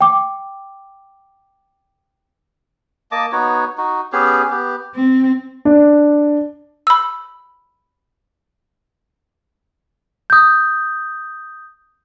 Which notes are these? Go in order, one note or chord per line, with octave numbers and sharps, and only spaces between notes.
G5 D6
A#3 D#5 A5 D6
B3 D#4 F#4 C#5
D#4 F#4
B3 C#4 G4 G#4
B3 G4
C4
D4
B5 E6
D#6 G6